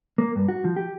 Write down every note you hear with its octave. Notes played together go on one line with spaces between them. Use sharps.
A#3
G2
F#4
F3
G4